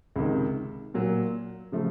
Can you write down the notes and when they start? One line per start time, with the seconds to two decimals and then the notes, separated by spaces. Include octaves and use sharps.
0.16 C#2 C3 D#3
0.94 A#2 F#3 A#3
1.72 C#3 F3 A3